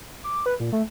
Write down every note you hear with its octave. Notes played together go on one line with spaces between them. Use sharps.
D6
B4
A#2
A3